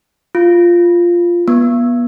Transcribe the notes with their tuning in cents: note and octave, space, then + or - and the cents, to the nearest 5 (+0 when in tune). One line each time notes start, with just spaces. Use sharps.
F4 -5
B3 -30